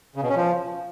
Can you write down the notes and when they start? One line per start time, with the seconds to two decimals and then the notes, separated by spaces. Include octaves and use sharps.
0.16 C#3
0.22 B2
0.29 C#4
0.36 F3